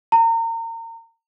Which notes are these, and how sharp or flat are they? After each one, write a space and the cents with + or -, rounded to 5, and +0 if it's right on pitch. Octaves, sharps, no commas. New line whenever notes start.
A#5 -30